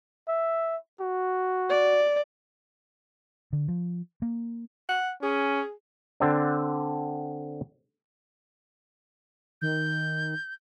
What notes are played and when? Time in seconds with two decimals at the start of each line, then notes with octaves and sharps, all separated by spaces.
0.28 E5
1.00 F#4
1.69 D5
3.53 D3
3.68 F3
4.22 A#3
4.89 F#5
5.23 C#4 G#4
6.20 D3 C4 D4
9.62 D#3 G6